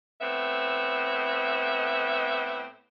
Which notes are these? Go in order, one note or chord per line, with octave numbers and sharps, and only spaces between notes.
A2 B3 C4 E5